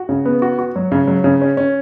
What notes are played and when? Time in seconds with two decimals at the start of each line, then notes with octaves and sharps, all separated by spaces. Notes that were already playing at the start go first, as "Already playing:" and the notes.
Already playing: F#4
0.09 C#3
0.25 B3
0.42 F#4
0.59 F#4
0.76 F#3
0.92 C#3
1.08 F#3
1.24 C#3
1.41 C#4
1.57 C#4